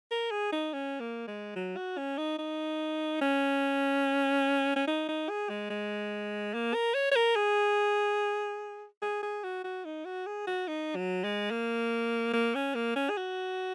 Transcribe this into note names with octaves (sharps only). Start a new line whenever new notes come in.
A#4
G#4
D#4
C#4
A#3
G#3
F#3
F#4
C#4
D#4
D#4
C#4
C#4
D#4
D#4
G#4
G#3
G#3
A#3
A#4
C#5
C#5
A#4
G#4
G#4
G#4
F#4
F#4
D#4
F#4
G#4
F#4
D#4
F#3
G#3
A#3
A#3
C#4
A#3
C#4
G#4
F#4